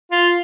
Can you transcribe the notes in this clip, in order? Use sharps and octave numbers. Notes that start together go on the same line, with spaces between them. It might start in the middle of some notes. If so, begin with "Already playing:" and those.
F4